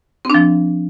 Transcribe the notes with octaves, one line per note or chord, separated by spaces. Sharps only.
F3 C4 D4